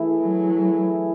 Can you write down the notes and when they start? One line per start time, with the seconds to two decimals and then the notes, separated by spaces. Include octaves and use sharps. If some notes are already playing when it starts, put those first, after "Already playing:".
Already playing: E3 A3 E4 G#4
0.21 F#3